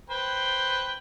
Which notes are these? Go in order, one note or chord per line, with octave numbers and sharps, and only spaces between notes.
B4 C5 G5